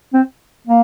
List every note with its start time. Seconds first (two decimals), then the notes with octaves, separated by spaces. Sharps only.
0.13 C4
0.67 A#3